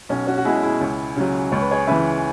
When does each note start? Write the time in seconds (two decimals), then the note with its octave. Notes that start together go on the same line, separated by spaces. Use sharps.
0.09 B1 C#4
0.27 C#4 F#4
0.38 F#4
0.45 B2 G#3 E4 G#4
0.63 E4 G#4
0.81 C#2
1.17 C#3 F#3
1.52 C#2 C#5
1.62 B4
1.71 G#4 C#5
1.87 C#3 E3 B4 E5